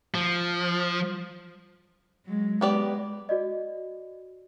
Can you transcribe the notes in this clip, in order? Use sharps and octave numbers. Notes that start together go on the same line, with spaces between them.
F3
F#3 G#3
G#3 B3 G4 D5
F#4 D5 D#5